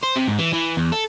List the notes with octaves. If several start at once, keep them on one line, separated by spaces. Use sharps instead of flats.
C5
C3
G#2
E3
E3
E2
A4